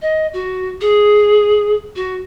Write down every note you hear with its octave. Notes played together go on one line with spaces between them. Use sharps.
D#5
F#4
G#4
F#4